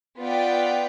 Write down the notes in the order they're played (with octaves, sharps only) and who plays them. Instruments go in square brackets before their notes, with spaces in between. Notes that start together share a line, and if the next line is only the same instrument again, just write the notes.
[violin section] B3 F4 B4 D5 G5